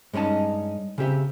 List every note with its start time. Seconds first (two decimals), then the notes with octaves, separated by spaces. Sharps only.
0.13 G2 G#3 C#4 D#4 A5
0.98 C#3 C4 G4 E5